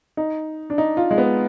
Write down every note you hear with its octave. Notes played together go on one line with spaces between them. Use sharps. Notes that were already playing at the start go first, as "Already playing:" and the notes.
D#4
D4
D#4
F4
G#3
B3